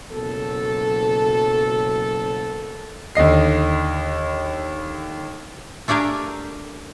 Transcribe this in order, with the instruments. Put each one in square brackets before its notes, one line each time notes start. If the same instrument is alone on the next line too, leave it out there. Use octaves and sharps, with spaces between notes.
[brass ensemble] F#1 B2 F#3 B3 A4
[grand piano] D#2 D3 D#5 C7
[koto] A3 D4 G4 G#4 A#4